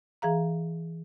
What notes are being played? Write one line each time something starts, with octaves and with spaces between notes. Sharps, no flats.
E3 G#4 F5 A#5